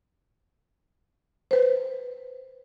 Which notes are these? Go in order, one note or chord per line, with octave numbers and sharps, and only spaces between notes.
B4 C5